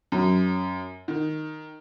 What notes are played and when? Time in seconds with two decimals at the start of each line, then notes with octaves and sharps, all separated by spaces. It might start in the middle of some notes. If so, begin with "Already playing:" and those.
0.12 F#2
1.08 D#3